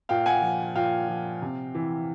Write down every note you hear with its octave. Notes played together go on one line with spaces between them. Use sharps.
A#2 F5 G5
F#5 G#5
F3
A#2 F5 G5
F3
C3
E3